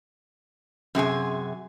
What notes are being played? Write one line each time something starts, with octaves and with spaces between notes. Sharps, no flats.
F#2 C3 G#4 G#5